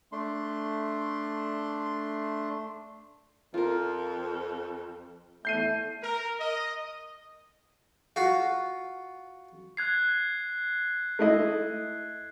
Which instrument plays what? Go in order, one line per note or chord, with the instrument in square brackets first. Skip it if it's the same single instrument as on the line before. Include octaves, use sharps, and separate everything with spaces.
[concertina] A3 D4 C6
[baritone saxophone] F2 [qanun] F4 A#4
[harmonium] E2 A3 [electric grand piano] G6 C7 D#7
[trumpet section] A#4
D#5
[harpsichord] F4 F#4
[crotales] F#6 G#6 C7
[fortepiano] A3 E4 D#5